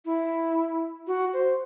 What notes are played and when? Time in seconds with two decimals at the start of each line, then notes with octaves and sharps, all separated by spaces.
0.05 E4
1.07 F#4
1.33 C5